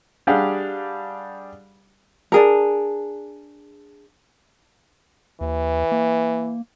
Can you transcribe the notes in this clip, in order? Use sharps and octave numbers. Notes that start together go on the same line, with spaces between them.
G3 D4 G4 G#4 F5 F#5
D4 G#4 A#4
D#2 E3
A#3